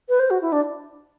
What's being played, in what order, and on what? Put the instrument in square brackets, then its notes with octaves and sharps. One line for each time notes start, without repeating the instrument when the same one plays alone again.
[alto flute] B4
C5
F#4
E4
D4